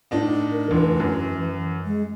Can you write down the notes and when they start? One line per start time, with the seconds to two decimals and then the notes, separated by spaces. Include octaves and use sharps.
0.11 A2 D4 D#4
0.52 A#4
0.71 F1 D3 E3
1.00 F#2
1.85 G#3